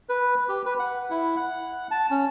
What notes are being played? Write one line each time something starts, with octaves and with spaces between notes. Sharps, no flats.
B4
G4
B4
F#5
E4
F#5
A5
C#4